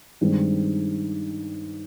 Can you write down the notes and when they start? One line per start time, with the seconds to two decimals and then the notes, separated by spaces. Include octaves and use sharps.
0.21 G2 D#3 G#3 C4